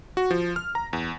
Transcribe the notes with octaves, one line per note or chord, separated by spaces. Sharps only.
F#4
F3
F6
A#5
E2